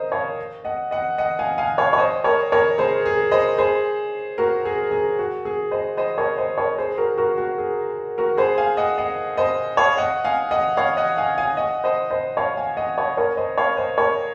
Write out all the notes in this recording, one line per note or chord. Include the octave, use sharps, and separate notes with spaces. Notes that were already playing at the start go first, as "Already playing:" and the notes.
Already playing: A#4 C5 D#5
C#5 F5
D#5 F#5
D#5 F#5
D#5 F#5
F5 G#5
F5 G#5
C#5 F5
C#5
C5 D#5
A#4 C#5
A#4 C#5
G#4 C5
G#4
C5 D#5
G#4 C5
F#4 A#4
G#4
G#4
F#4
G#4
C5 D#5
C5 D#5
A#4 C#5
C5 D#5
A#4 C#5
G#4 C5
F#4 A#4
F#4 A#4
F#4
G#4
F#4 A#4
G#4 C5
F5 G#5
D#5 F#5
D#5 F#5
C5 D#5
C#5 F5
D#5 F#5
F5 G#5
D#5 F#5
C#5 F5
D#5 F#5
F5 G#5
F5 G#5
D#5 F#5
C5 D#5
C5 D#5
C#5 F5
F5 G#5
D#5 F#5
C#5 F5
A#4 C#5
C5 D#5
C#5 F5
C5 D#5
A#4 C#5